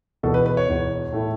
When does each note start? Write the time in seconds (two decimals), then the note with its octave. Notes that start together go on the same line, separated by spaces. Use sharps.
0.23 E1 E2 B2 A4
0.34 B4
0.46 B4
0.57 C#5
0.68 E1 E2 B2
1.12 A2 A3 E4